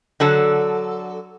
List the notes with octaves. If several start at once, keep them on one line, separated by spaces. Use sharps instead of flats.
D3 F#3 A4